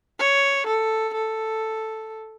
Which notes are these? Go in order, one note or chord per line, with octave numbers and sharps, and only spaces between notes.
C#5
A4
A4